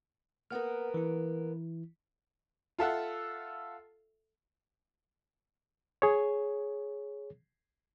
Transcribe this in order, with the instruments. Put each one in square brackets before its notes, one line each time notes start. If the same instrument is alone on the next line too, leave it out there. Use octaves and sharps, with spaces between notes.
[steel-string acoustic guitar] A#3 B3 A#4 [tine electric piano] F#5 F6
[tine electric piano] E3 E4
[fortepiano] F4 A4 E5 F#5
[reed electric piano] G#4 C#5